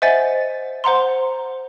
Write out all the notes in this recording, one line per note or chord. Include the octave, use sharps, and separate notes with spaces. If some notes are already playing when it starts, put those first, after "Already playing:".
C5 D#5 E5 F#5 G#5 A6
C5 F#5 A#5 C6